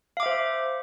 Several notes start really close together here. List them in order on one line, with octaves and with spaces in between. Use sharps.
F5 D6 E5 C5